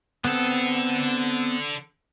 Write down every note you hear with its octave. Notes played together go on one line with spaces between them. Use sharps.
D3 B3 C4 A4